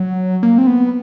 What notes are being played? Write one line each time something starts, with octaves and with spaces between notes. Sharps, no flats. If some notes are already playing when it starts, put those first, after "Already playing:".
Already playing: F#3
A#3
C4
B3